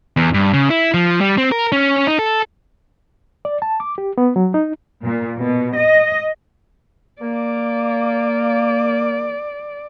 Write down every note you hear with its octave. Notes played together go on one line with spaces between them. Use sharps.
E2
G2
C#3
E4
F3
G3
C4
A#4
C#4
D#4
A4
D5
A5
D6
G4
B3
F#3
D#4
A#2
B2
D#5
A#3 D5